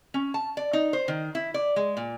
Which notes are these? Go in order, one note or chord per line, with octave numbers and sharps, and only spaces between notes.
C#4
A5
D5
D#4
C5
D#3
E4
D5
G#3
A#2